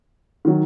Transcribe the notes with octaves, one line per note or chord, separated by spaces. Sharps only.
D#3 F#3